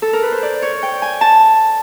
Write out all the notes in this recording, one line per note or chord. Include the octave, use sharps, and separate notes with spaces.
A4
A#4
B4
C5
D5
C#5
G5
G#5
A5